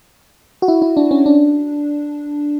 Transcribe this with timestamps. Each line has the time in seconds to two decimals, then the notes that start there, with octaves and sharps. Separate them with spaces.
0.62 F#4
0.68 E4
0.82 E4
0.97 D4
1.11 C#4
1.26 D4